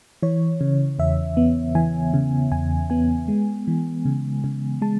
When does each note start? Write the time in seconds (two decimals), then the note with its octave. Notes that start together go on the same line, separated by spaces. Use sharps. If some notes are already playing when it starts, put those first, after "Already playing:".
0.23 E3 C#5
0.61 C#3
0.99 E2 E5
1.37 B3
1.75 E3 G#5
2.14 C#3
2.52 E2 G#5
2.90 B3 G#5
3.28 G#3
3.68 E3
4.05 C#3
4.44 C#3
4.82 G#3 A5